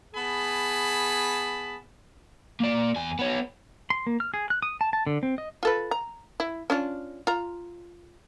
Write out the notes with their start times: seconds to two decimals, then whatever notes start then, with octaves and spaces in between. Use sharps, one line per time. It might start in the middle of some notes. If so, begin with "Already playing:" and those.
0.15 B3 G#4 A5 B5
2.60 A#3 D5
2.96 E2 G#5
3.19 B3 C#5
3.90 C6
4.07 A#3
4.20 F6
4.34 G#4
4.50 F#6
4.62 D#6
4.81 A5
4.93 A5
5.07 D3
5.23 C4
5.38 D#5
5.63 F4 A4 B4
5.91 A#5
6.40 E4
6.70 C#4 D4 F4
7.27 F4 A#5